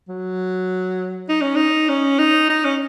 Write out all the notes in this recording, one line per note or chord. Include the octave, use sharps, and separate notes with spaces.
F#3
D#4
C#4
D#4
C#4
D#4
D#4
C#4